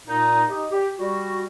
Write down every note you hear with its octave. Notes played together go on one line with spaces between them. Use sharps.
A#2 D#4
D#4 G4
G4
G3 F#4